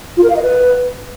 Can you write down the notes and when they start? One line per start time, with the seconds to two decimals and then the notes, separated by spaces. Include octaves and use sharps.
0.17 F4
0.23 A#4
0.30 F5
0.36 D#5
0.42 B4